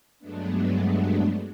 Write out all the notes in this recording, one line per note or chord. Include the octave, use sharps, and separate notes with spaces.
G2 F#3 G#3 A3 B3 D4